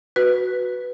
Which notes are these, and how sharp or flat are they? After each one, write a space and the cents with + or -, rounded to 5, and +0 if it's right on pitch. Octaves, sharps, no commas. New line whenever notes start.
F#4 +0 B4 +0